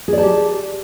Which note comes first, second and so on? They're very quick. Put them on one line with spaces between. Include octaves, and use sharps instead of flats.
G#4 D5 A5 G4